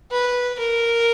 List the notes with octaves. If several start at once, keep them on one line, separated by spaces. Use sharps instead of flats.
B4
A#4